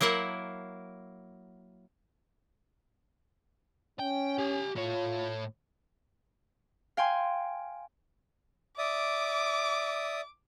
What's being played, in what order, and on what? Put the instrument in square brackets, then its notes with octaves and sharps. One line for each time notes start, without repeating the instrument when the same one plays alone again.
[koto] F#3 A#3 E4 A#4 F#5
[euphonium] C#4 [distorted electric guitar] G5
[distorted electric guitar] G4 G#5
[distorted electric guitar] A2 C#5 [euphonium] F4
[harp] F5 G5 G#5 C6
[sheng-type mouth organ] D5 E5 D#6 [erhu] D6